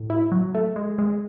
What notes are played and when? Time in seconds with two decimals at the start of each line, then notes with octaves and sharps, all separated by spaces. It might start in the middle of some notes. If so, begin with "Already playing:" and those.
Already playing: A2
0.10 E4
0.32 F#3
0.55 A3
0.76 G#3
0.98 G#3